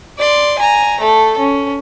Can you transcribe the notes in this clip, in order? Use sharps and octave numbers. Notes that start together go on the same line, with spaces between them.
D5 C6
G#5 A#5
A3 A4
C#4